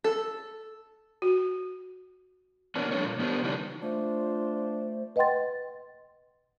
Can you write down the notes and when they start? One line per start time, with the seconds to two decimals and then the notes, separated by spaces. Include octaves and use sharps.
0.04 A4
1.22 F#4
2.76 C3 A#3 B3 C#4 D4
2.91 G2 D3 D4 A4 C#5
3.04 A#2
3.19 E3 B3 C4 D4 G4 A#4
3.43 C#3 E3 G3 D4 D#4
3.82 A3 D4 F4 C5
5.16 B4 D#5 F#5 G5 C6 A6